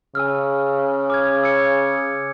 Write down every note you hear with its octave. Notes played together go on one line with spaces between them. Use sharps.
C#3 G#5 E6 F6
D6 F6 G#6
E6 G#6 C#7